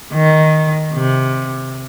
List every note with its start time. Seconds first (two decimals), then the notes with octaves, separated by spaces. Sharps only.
0.14 D#3
0.94 C3